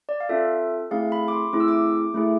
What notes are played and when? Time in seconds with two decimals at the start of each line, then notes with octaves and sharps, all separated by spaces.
0.09 D5
0.20 F5
0.29 C4 F4 A4 E5
0.91 A3 C4 E4 G#4 F5
1.12 B5
1.28 D6
1.33 C6
1.53 A3 C4 E4 G#4 D6
1.60 E6
1.68 D6
2.14 A3 E4 G#4